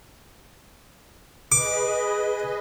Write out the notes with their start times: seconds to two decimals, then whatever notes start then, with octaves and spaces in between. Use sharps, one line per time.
1.52 G#4 B4 D#5 D6